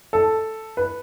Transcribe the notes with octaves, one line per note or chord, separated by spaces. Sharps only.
A4
B4